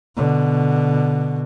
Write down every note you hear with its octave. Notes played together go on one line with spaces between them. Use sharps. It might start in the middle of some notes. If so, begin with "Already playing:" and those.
B2 D3